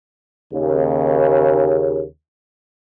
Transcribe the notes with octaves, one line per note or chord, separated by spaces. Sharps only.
D#2 C#3